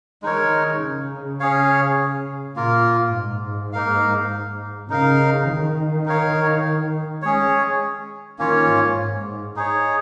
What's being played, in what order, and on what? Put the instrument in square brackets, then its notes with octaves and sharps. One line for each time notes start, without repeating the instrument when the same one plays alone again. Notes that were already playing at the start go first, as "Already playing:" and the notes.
[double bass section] D#3 [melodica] G#3 D#4 A#4 C#5
[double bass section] C#3
[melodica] C#4 G#4 C#5 F5
[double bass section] A#2 [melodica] A#3 F4 A#4
[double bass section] G#2
[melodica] A#3 D#4 A#4 F5
[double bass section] C#3 [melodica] D#4 A#4 F5
[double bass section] D#3
[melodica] D#4 A#4 C#5 F5
[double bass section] G#3 [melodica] C#4 G#4 C#5
[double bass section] D#3 [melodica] A#3 C#4 F4 C#5
[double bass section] G#2
G#2
[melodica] D#4 G#4 C#5